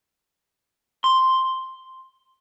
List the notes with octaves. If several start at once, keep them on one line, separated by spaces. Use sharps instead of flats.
C6